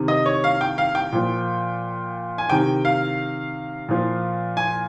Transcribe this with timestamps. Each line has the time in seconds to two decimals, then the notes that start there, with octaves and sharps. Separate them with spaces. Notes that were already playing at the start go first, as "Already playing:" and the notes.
Already playing: C3 D#3
0.08 D#5
0.26 C#5
0.44 F5
0.61 G5
0.78 F5
0.95 G5
1.12 A#2 F3
2.38 G#5
2.50 C3 D#3 G5
2.85 F5
3.89 A#2 F3
4.57 G#5